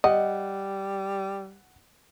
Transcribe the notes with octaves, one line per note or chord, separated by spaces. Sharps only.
G3 D#5 F#5